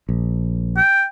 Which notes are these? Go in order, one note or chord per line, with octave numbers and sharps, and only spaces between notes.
A#1
G5